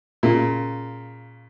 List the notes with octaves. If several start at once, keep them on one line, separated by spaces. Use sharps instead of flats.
A#2 C#3